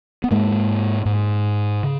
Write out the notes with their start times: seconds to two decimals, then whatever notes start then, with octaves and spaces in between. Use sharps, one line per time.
0.24 B3
0.31 G#2 G#3 A#3
1.06 G#2
1.83 C#3